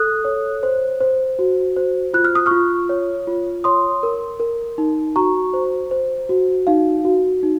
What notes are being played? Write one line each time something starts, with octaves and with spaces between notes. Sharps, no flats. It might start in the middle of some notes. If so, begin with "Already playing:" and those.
Already playing: A4 D#6 F#6
C#5
C5
C5
F#4
C5
F4 F#6
F6
D#6
F4 C#6 F6
C#5
F4
C#5 C6 D#6
A#4
A#4
D#4
F#4 A#5 C#6
C5
C5
F#4
D#4 F5
F#4
D#4